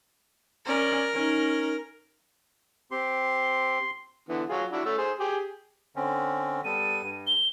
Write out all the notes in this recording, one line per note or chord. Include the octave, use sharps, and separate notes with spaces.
C#4 A#4 D5
C#4 D#4
C4 G4 C6
D3 E3 B3
F#3 F4 G#4
D4 E4 F#4
A3 C#4 E6
G#4 C5
G4 G#4
D3 C4 C#4
G3 B3 A4 D#7
G2
G7